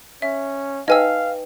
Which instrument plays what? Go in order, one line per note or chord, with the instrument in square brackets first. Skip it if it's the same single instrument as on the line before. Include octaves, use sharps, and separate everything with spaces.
[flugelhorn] C#4 [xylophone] E5
[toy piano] D#4 B4 G5 [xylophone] D#5 G#5 E6 [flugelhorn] F5